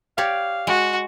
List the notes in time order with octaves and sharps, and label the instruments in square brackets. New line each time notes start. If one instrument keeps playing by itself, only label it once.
[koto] G4 C#5 D5 [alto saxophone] F5
[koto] G#3 [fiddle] F#4